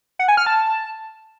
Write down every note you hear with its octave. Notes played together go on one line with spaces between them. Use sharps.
F#5
G#5
F6
A5